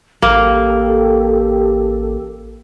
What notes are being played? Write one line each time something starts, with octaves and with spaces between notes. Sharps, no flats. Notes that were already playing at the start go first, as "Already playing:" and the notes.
A1 A#3 G4 A4